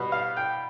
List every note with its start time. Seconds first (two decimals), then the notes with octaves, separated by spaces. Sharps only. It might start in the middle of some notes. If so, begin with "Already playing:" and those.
Already playing: B2 G3 B3
0.12 F5
0.37 G5